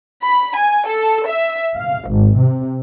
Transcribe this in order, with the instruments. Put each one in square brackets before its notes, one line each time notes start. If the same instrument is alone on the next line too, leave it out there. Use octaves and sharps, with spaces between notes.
[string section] B5
G#5
A4
E5
F5
G#1
C3